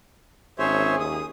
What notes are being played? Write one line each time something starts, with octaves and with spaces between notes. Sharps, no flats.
G#1 C#4 G#4 C5 C#5 E5
D#2 D#6